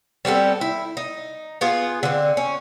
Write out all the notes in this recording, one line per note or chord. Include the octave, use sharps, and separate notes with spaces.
G3 B3 C4 A4
E4
D#4
B3 F4 G#4
D3 C4
C#4